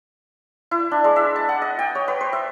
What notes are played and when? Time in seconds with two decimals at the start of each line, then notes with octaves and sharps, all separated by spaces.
0.71 E4
0.91 D4
1.04 G#3
1.16 E5
1.36 A5
1.49 F#5
1.62 D#5
1.79 G5
1.95 C#5
2.08 B4
2.21 C5
2.33 E5